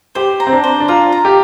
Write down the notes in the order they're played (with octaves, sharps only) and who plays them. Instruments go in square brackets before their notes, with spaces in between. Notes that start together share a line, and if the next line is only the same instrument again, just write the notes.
[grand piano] G4 [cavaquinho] C5
[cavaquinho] A#5
[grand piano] C4
D4
[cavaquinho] C5
[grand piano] D4
[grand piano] F4 [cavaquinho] A#5
[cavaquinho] A#5
[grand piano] G4